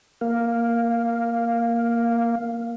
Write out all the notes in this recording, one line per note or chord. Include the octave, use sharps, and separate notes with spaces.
A#3 F5